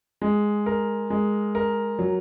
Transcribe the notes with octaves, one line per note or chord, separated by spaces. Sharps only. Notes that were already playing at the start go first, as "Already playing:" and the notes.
G#3
A#4
G#3
A#4
F#3